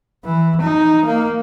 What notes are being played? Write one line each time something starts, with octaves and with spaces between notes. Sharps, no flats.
E3
D#4
A#3